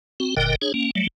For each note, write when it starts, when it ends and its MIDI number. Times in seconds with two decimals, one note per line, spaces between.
0.20 0.35 60
0.20 0.35 66
0.37 0.55 30
0.37 0.55 46
0.37 0.55 50
0.37 0.55 70
0.37 0.55 75
0.37 0.55 79
0.62 0.72 62
0.62 0.72 68
0.62 0.72 73
0.74 0.91 58
0.74 0.91 61
0.95 1.07 54
0.95 1.07 55
0.95 1.07 57